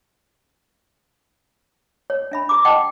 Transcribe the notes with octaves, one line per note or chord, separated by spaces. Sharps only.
C#5
D4 E5 B5
G#4 A#5 D6
D#5 F#5 G5 A5